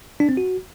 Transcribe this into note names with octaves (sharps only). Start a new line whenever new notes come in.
D4
C4
F#4